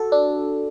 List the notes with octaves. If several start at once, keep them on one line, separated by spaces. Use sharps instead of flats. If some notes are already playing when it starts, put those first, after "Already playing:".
Already playing: F#4 A4
D4